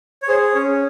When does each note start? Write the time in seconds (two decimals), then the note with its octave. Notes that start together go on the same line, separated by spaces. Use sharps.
0.22 C#5
0.28 G#4 C5
0.54 C#4 C#5